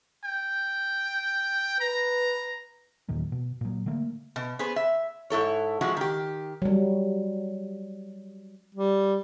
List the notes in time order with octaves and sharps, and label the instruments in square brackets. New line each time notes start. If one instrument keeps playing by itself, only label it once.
[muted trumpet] G5
[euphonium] B4 [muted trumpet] A#5
[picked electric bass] D#2 A#2 D#3 F#3
B2
A#2 F#3
D3 A3 A#3
[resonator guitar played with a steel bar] B2
B3 G#4 B4 C5
E5
G#2 E4 A4 C#5
F3 G#3 E4 F#4
D#3 G4
[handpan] F#3 G3
[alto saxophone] G3